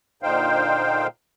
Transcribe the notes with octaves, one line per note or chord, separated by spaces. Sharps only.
A#2 D3 D#4 C5 F5 G5